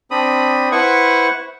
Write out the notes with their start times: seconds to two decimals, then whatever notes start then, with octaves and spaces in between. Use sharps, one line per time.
0.11 C4 D4 B5 D#6
0.72 E4 B4 C5 F#5 C#6